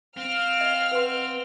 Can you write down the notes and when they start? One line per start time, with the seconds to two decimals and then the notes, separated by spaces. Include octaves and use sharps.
0.17 C4 F5 F6
0.61 D#5
0.91 B4 F#5 C6